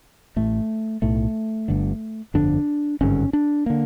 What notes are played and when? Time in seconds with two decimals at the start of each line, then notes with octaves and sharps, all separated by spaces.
0.36 A1 A2 A3
1.02 B1 A2 A3
1.68 G1 G2 D3
2.34 G1 F2 D3 D4
3.01 G#1 G2 D3 C#4
3.33 D4
3.66 D3 A#3